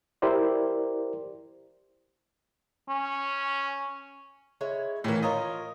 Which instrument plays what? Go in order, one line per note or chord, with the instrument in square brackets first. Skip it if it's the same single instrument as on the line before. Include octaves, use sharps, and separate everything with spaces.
[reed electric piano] E4 G4 A#4 C5 D5
[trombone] C#4
[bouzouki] G#3 E4 C#5
[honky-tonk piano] A2 E3 [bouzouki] A#3 C#4
[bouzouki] F4 A#4 C#5 [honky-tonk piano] D#5